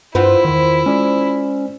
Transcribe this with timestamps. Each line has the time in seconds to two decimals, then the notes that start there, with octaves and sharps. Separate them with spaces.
0.15 G2 C4 E4 F4 B4 F#5
0.45 E2 D#3 C5
0.86 G#3 C#4 C5 D5